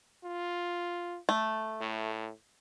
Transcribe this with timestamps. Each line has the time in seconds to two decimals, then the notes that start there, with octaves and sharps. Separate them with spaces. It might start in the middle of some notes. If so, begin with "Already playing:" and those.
0.24 F4
1.29 A3
1.81 A2